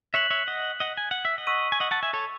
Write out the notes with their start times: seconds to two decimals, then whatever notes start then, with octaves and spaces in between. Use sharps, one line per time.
0.14 C#5 E5 F#6 B6 F#7
0.30 C#5 E5
0.48 D#5 F#5
0.80 D#5 F#5
0.97 G#5
1.11 F#5
1.25 E5
1.38 D#5 F#5
1.47 C#6 E6 B6 D#7
1.72 G#5
1.80 D#5 F#5
1.91 F#5 A5
2.03 E5 G#5
2.13 A4 C#5